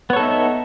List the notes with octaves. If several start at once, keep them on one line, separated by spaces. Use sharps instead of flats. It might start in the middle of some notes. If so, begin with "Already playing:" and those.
B3 D#4 A4 C#5 E5